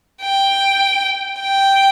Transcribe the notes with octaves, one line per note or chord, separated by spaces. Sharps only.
G5
G5